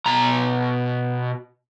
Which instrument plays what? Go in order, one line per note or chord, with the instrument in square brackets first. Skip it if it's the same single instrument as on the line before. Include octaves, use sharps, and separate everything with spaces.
[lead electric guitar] B2 A#5